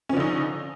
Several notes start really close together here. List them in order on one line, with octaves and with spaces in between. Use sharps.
C#4 F3 D3 D#4